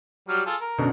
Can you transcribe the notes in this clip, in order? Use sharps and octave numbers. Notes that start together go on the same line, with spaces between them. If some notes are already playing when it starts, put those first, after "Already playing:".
F#3 G3 F6
F4 G#4 A4
A#4
F#2 B2 D3